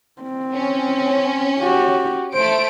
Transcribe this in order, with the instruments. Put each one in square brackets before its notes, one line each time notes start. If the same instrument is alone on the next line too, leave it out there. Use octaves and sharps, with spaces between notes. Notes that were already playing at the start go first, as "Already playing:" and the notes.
[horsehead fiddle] C4
[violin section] C#4
[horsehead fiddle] F#4 G4
[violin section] A3 D7 [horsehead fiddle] C5